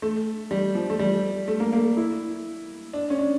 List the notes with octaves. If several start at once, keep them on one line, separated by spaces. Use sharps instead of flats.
A3
G3
F3
A3
G3
A3
A#3
A#3
E4
D4
C#4
D4